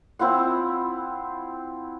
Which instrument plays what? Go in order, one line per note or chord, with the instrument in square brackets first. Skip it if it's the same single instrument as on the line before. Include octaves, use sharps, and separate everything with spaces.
[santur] C4 E4 F4 F#5